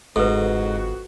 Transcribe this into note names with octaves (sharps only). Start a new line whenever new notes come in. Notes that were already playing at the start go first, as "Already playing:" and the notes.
G1 F2 G#2 F#4 A4 B4